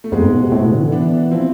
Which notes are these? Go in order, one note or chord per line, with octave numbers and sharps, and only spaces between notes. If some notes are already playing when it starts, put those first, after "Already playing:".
A3
F2 G#3 B3
G#2
B2
C3
A2
B2
D3
E3
B3 D4
F3 C4 E4